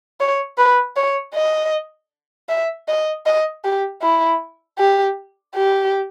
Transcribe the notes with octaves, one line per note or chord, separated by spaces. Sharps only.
C#5
B4
C#5
D#5
E5
D#5
D#5
G4
E4
G4
G4